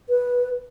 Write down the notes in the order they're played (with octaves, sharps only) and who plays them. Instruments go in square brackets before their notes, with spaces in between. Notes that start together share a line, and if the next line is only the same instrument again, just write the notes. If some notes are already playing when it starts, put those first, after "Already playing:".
[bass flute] B4